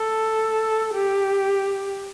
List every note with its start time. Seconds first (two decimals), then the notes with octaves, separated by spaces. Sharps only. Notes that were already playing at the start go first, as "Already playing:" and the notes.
Already playing: A4
0.94 G4